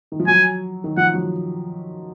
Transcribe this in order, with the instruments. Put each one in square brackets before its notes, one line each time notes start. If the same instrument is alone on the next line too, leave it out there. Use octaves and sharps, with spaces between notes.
[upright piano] D#3
F3
[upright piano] F#3 [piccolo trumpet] G#5
[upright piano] D#3
[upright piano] F3 [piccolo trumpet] F#5
[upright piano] F#3